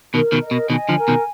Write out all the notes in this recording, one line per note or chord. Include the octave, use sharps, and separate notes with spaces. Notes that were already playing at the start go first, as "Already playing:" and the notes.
B2 D#3 A#4
B2 D#3
D#5
B2
B2 D#3 G#5
D3 F3
A#4
B2 D#3